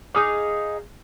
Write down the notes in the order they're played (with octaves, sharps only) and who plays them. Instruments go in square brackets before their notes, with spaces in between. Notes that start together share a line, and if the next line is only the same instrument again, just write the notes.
[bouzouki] D#4 G#4 F5 [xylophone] D6 D#6